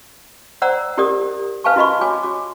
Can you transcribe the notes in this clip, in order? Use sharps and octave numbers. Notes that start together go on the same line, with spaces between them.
C5 D5 F#5 A#5 E6
E4 G4 A#4 D5 D#6
B4 F5 G#5 A5 C#6
E4 F#4 D#5 B5 C#6
F#4 C#5 G#5 D6
F#4 D6